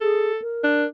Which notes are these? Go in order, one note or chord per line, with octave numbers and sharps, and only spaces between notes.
G#4 A4
A#4
D4